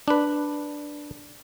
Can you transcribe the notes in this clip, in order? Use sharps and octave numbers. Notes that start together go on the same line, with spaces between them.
D4 B4